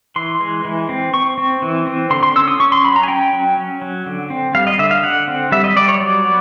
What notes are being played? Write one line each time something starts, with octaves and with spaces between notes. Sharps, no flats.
E3 C6
G#3
E3
C4
C4 C#6
C4
E3
C4
D3 C6
C6
C#4 E6
D#6
C#4 C#6
C6
F#3 B5
A#5
G#5
C#4 G5
F#3
C#4
F#3
D3
C4
G3 F5
D#5
D3 E5
F5
D3 F#5
C4
G3 E5
D#5
G3 D5
C#5
F#3 D5
B3